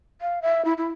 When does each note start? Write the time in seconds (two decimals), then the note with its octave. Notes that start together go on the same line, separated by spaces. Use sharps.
0.21 F5
0.42 E5
0.65 E4
0.78 E4